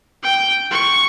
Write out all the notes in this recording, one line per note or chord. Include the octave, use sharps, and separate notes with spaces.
G5
C#6